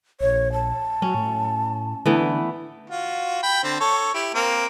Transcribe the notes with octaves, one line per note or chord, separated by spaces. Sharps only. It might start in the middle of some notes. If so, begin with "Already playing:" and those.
A#1 C#5
A5
F#3 C#4
A2
D3 E3 A3 B3
F4 F#4
G5 B5
D3 C4
A4 C#5
E4 G4
A#3 C4 A#4